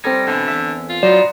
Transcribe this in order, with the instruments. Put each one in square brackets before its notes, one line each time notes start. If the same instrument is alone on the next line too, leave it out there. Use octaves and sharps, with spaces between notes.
[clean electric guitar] G3 D#4 [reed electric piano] C4 A4 G#6
[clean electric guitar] B2 E3 [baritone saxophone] D3
[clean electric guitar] E2 E5
[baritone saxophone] F4
[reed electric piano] F#3 [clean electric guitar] B3 D#4 C5 [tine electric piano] D5